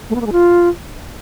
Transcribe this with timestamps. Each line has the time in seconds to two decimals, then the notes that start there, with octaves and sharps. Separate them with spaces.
0.10 A3
0.15 B3
0.21 A#3
0.27 G#3
0.32 F4